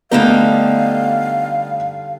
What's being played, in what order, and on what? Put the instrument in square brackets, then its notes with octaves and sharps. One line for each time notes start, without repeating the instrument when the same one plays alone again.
[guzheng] D3 G3 D#4 [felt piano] A3 B3 [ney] F5